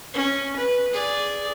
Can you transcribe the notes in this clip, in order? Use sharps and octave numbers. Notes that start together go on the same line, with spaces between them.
C#4
B4
G#4 D5